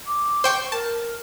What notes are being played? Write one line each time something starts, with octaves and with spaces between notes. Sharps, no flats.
D6
C5 G5 C#6
A#4 A5